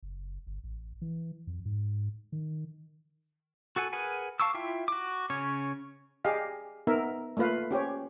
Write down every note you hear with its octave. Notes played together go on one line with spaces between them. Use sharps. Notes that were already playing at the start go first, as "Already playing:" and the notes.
F#1
G1
A1
E3
F2
G#2
D#3
F#4 A4 F#5 G#5
G#4 A#4 B4 F#5 G#5
F5 A5 C#6 D6 E6
E4 F4 E5 G5
F#4 D6
C#3 C#4 C#5
G4 G#4 D#5 F5
B3 D#4 A#4 E5
A3 A#3 F4 B4 F5
C#4 G4 C5 C#5